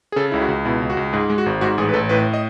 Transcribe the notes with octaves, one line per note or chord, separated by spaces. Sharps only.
G#4
C#3 A4
C#2 E4
F#4
C#2
B2 E4
C#2
F#4
C#2
G#2 G#4
G#3
F#4
G#1
G#2 F#4
A1 G#4
B4
A1 A4
A2 B4
D#5